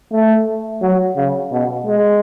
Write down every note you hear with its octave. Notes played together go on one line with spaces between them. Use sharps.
A3
F#3
C#3
B2
G#3